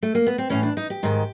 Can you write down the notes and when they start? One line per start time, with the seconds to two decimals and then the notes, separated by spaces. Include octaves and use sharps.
0.03 A3
0.15 A#3
0.27 B3
0.38 C4
0.50 A2 E3 C#4
0.63 D4
0.77 D#4
0.90 G4
1.03 G#2 D#3